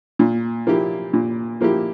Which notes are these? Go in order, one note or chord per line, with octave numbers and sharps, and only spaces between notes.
A#2
F3 A#3 E4 G4
A#2
F3 A#3 E4 G4